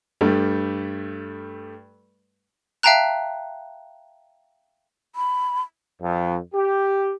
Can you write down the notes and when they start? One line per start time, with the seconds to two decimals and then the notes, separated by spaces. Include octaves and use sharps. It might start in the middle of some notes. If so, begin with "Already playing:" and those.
0.21 G2 G3 A3
2.83 E5 F5 G5 A5 A#5 F#6
5.16 B5
6.02 F2
6.55 G4